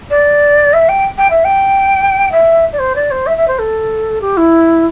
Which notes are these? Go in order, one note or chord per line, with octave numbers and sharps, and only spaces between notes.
D5
E5
G5
G5
E5
G5
E5
D5
C5
D5
C5
E5
E5
C5
A4
G4
E4